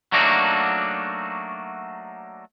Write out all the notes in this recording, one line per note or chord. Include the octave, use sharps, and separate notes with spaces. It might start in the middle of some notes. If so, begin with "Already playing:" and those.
F#3 A3 A#3 D4 D#4 F#4